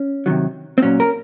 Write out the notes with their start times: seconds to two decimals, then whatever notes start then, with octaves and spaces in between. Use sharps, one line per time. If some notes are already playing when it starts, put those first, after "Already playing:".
Already playing: C#4
0.26 C3 D#3 F#3
0.78 C4
0.82 A#2 F#3 C#4
1.00 A#4